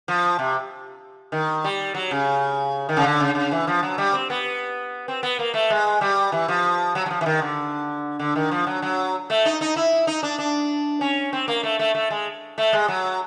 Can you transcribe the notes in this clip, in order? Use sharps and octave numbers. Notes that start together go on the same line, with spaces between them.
F3
C3
D#3
G3
F#3
C#3
D#3
C#3
D3
C#3
C#3
E3
F3
F#3
G3
C4
B3
C4
B3
A#3
A3
G#3
G3
E3
F3
F#3
F#3
F3
E3
D#3
D3
D3
D#3
F3
F#3
F#3
A3
D#4
D#4
E4
D#4
D4
D4
C#4
C4
A#3
A3
A3
A3
G#3
A3
G#3
F#3